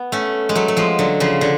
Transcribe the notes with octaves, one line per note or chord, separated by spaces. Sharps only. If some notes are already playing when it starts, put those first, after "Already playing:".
Already playing: B3
A3 C#4
G#3
F#3 A3
A3
F3 G#3
D3 F#3
C#3 F3
D3